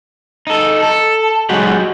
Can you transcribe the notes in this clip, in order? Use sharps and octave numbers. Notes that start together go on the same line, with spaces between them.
D#4 A4
A4
F#3 G#3 D#4 F#4 G4